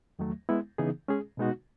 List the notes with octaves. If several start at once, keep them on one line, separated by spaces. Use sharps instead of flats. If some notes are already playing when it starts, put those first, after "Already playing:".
E2 D#3 F#3 A3
G#3 B3 E4
C#3 E3 B3 D#4 G#4
G#3 C#4 G#4
B2 G#3 B3 D#4 F#4